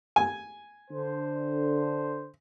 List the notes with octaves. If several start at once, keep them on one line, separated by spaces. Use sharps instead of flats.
G#5
D3 C5